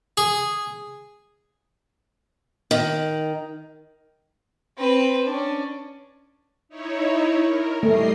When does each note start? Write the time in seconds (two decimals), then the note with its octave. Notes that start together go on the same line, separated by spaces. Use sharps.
0.17 G#4
2.71 D#3
4.78 C4 B4
5.26 C#4 D4
6.69 D#4 E4 C#5
7.44 A#4
7.83 G3 A3 D#5 C7